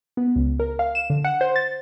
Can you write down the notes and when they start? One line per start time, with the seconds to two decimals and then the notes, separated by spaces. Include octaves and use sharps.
0.17 B3
0.36 C#2
0.60 A#4
0.79 F5
0.95 E7
1.10 D3
1.25 F#5
1.41 C5
1.56 A6